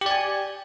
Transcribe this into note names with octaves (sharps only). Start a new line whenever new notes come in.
G4 D5 G#5